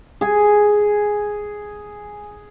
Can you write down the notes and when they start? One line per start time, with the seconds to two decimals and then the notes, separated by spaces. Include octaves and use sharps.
0.21 G#4 G#5